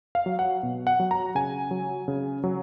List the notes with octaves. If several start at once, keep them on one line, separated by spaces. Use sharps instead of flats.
F5
F#3
F#5
B2
F#5
F#3
A#5
C#3 G#5
F#3
C#3
F#3